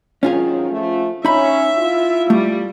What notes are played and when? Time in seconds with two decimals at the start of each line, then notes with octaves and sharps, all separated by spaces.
0.23 G#2 D#3 F#3 C#4 F4 G#4
0.71 F3 A3
1.25 C#4 D#4 E5 B5
1.78 E4 F4
2.30 G3 A3